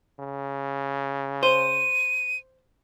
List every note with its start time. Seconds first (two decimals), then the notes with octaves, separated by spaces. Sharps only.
0.19 C#3
1.43 C5 D#7